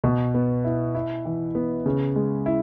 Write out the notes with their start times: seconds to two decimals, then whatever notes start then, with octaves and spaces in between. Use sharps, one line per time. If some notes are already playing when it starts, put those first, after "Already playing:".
0.04 B2
0.34 B3
0.64 E4
0.95 E4
1.25 E3
1.55 B3
1.86 C#3
2.16 G#3
2.46 E4